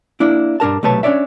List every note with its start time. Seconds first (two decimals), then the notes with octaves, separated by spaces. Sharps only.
0.20 A#3 D4 E4
0.60 G2 D4 A#4 A5
0.83 B1 C3 A3 B4 C#5 A5
1.03 C#4 D4 C#5 D5 E5